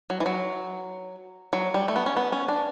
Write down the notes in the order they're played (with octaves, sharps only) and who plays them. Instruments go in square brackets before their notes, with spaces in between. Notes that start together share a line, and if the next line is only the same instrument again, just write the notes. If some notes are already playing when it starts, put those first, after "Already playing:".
[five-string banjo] F#3
E3
F#3
F#3
G3
A3
B3
C#4
B3
C#4
D4